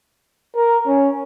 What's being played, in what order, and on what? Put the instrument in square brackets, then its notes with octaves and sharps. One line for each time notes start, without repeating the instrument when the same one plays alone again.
[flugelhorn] A#4
C#4